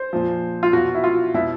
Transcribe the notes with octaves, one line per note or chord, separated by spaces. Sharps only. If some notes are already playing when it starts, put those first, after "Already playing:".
Already playing: C5
A#2 F3
F4
B2 F#3 F#4
E4
F4
B2 F#3 E4